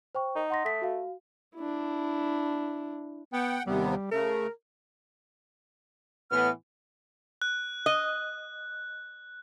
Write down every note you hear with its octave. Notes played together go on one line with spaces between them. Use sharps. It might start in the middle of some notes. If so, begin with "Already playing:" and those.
C5 G5 C#6
D#4
F#5 C6 A#6
A3 D#6 B6
F#4 F5
D4 E4
B3 F#5 G5
D#2 C3 G3 B3
C#3 A3 A#4
A2 E3 B3 F6
F#6
D#5